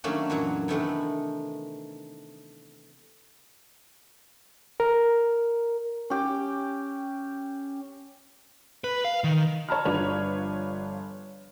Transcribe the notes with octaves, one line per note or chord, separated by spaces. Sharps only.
D#3 F#3 A3 A#3 C#4 D4
F#2 A#2 E3 F#3
C3 D#3 E3 A3 B3 D4
A#4
C#4 G4
B4
F5
D#3
C#5 A5 A#5 F6
G1 F3 D4 B4 C#5 F7